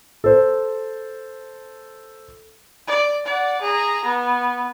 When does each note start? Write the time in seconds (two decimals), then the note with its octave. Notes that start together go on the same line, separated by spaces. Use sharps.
0.24 A4 C5
2.87 D5
3.26 D5 F#5
3.61 G#4 A#5
4.05 B3